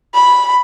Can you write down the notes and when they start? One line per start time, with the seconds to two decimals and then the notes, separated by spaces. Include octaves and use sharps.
0.15 B5